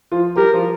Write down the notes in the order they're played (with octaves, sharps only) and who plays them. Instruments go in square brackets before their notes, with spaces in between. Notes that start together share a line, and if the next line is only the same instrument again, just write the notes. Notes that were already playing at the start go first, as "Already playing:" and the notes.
[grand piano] F3 F4
[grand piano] G3 G4 [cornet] A#4
[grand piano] F3 F4